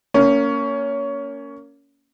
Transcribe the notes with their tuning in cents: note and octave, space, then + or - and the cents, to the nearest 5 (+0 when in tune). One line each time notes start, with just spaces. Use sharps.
A#3 -10 C#4 +20